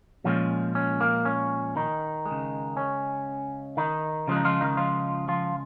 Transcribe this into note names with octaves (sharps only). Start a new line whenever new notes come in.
A#2 F3 G#3 C#4
C#4
A#3
C#4
D#3 D#4
G#3
C#3
C#4
D#3 D#4
C#3 F3 G#3
D#4
F3 F4
D#3 D#4
F3 F4
F3 F4